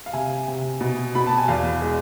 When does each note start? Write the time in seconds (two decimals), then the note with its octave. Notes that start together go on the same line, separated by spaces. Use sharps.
0.06 F5
0.13 C3 E5 G#5
0.48 C3
0.81 B2
1.15 B2 B5
1.26 A5
1.38 G#5
1.48 E2 F5
1.82 G#3